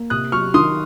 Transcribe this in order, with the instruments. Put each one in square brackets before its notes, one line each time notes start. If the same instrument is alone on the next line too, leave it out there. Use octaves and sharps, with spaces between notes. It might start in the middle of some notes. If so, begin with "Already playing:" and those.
Already playing: [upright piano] A#3
[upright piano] C3 [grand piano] D#6 F#6
[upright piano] F#3 [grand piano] C#6 F6
[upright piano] D#3 [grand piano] C6 D#6